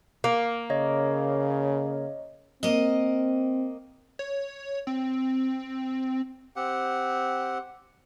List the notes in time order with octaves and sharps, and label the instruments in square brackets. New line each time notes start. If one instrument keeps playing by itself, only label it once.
[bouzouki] A#3
[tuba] C#3 [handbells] C#5 D#5
[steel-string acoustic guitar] A#3 D#5 [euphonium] C4
[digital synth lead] C#5
C4
[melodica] C4 G4 F#5